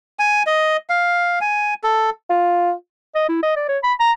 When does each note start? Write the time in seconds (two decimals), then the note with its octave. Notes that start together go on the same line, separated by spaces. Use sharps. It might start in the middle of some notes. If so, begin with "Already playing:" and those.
0.19 G#5
0.46 D#5
0.90 F5
1.41 G#5
1.84 A4
2.30 F4
3.15 D#5
3.29 E4
3.43 D#5
3.56 D5
3.69 C#5
3.83 B5
4.00 A#5